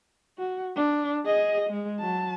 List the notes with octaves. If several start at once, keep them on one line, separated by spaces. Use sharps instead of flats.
F#4
D4
G#4 D#5
G#3
F#3 A5